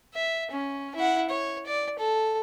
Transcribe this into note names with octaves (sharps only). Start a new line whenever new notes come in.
E5
C#4
E4 F#5
C#5
D5
A4